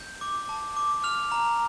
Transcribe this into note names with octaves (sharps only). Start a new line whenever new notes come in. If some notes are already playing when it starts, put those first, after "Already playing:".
Already playing: G6
D6
A5
D6
F6 F7
A#5